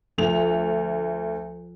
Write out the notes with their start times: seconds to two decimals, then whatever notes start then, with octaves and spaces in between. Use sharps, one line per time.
0.18 D2 F3 F4 F7